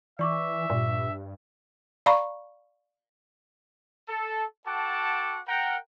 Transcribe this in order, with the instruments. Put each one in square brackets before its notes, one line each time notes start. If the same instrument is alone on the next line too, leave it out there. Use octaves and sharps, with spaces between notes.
[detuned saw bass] E3 [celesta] D5 C#6 D6 [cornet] E5
[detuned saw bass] G2 [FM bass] A#2
[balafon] D5 F5 A#5 B5 C#6
[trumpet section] A4
F#4 A4 F#5 G5 A5 D6
A#4 F#5 G5